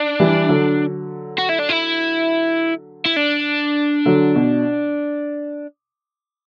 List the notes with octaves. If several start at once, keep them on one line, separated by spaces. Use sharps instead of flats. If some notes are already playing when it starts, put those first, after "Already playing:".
Already playing: D4
E3 G3
D3 F#3
F#4
E4
D4
E4
E4
D4
D3 F#3
B2